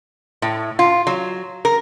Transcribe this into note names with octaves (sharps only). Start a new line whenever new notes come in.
A2
F4
F#3
A#4